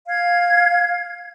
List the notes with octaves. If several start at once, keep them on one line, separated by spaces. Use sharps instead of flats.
F5 G#6